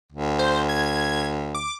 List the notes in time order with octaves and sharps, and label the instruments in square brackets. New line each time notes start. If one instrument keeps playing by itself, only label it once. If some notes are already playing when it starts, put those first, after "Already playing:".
[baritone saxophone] D2
[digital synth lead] C5
G#6
D6